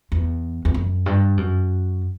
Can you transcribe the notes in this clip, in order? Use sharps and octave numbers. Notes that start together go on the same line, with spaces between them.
E2
E2
F#2
G2
F#2